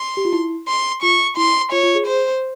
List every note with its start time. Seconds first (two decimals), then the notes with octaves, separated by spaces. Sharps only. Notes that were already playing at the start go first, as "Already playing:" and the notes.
Already playing: C6
0.17 G4
0.25 F4
0.32 E4
0.67 C6
1.02 F4 C#6
1.37 E4 C6
1.72 F4 C#5
1.83 F4
1.95 G#4
2.06 C5